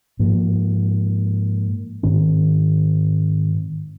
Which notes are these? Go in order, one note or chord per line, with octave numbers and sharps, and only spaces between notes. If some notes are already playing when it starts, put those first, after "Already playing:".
G#2 F3 A#3
G#2 D#3 C4